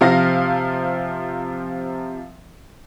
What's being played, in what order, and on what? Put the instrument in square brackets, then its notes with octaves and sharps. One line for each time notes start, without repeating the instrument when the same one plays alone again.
[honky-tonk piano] C3 F3 F5 A#6